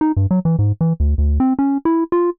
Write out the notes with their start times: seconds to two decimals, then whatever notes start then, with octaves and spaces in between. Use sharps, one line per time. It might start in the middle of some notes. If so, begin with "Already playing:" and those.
0.01 D#4
0.17 G2
0.31 F#3
0.45 E3
0.59 G#2
0.81 E3
1.00 D2
1.18 D2
1.40 C4
1.59 C#4
1.85 E4
2.12 F4